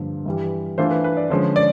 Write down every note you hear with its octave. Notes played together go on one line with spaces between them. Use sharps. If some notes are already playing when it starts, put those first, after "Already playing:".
Already playing: G2 D3 F3 A#3
G2 E3 G3
E3 A3 D4 F4 C5
B4
B4
D5
D3 F3 G#3 C#4
D5